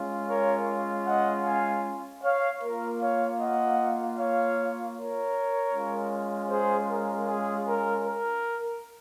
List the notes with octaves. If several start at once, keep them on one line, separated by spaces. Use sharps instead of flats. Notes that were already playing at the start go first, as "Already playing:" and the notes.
Already playing: G#3 C#4 F4
A#4 C#5
D#5 F#5
F5 G#5
C#5 F5
A#3 F4 A#4
C#5 F5
D#5 F#5
C#5 F5
A#4 C#5
G#3 C#4 F4
G#4 C5
A#4
G#4
A#4
A#4